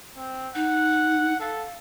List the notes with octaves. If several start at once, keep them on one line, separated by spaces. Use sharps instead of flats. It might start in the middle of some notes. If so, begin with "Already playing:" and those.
C4
D#4 F#5
A4 F5